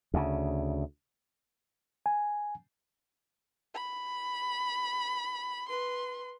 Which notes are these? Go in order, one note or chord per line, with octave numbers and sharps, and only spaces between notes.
D2 C#3
G#5
B5
B4 C6